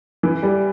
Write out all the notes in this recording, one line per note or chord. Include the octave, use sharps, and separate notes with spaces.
E3
G3